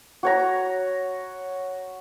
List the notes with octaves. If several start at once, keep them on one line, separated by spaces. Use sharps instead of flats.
F#4 C#5 A#5